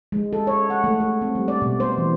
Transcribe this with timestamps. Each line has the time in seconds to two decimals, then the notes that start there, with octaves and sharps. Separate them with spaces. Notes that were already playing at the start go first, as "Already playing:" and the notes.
0.12 G#3
0.33 A4
0.47 C#5
0.70 F#5
0.84 A3
1.00 A3
1.22 C4
1.35 G3
1.48 D5
1.62 B2
1.80 C5
1.98 E3